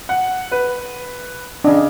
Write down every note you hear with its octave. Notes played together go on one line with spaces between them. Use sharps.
F#5
B4
C#3 D4 D#4